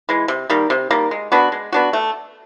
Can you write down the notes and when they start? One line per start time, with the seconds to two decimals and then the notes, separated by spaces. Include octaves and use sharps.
0.09 E3 G#3
0.28 C3
0.50 D#3 G3 A#3
0.70 C3
0.90 D#3 G3 A#3
1.11 G#3
1.32 B3 D4 F#4
1.52 G#3
1.72 B3 D4 F#4
1.93 A3